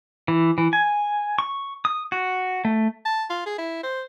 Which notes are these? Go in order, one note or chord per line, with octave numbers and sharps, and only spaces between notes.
E3
E3
G#5
C#6
D#6
F#4
A3
A5
F4
G#4
E4
C5